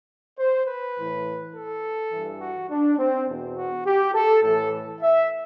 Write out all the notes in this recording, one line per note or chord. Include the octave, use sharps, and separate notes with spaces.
C5
B4
A2 E3
A4
G2 E3
F#4
D4
C4
E2 B2
F#4
G4
A4
A2 E3 A4
E5